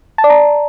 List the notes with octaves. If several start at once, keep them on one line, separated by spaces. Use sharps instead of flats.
A5
D5
A#5